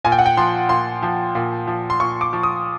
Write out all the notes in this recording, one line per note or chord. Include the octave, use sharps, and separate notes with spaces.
A#2 G#5
G5
F#5
G5
F3 C6
A#2 C6
F3
A#2
F3
C6
A#2 C#6
D6
F3
D#6